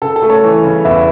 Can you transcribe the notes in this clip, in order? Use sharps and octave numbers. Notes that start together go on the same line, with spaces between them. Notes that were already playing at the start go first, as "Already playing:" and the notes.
C#3 A4
A4
A3
A4 C#5
E3
C#3
E2 B4 E5